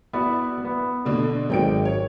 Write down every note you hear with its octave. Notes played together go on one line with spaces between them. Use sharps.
B3 E4 F#4 B4 D5
B3
B2 D3 D4
G#1 F#3 D5 G5 D7
C#5